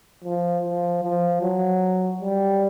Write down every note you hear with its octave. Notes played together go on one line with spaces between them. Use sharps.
F3
F3
F3
F#3
G3